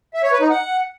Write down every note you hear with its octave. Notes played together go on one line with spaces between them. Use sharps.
E5
C#5
B4
D#4
F#5